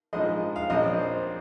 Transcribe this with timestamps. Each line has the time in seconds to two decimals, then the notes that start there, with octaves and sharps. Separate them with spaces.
0.13 A#1 G#2 F3 G#3 D#5
0.56 F5
0.70 A#1 A#2 F3 C4 D#5
0.84 D5
0.98 C5